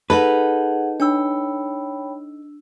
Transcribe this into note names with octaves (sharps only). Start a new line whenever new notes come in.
D#4 G#4 A4 B4 F#5
D4 C#5 G5 B5 E6